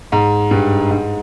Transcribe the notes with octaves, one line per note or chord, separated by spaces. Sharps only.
G#2
G2
G#2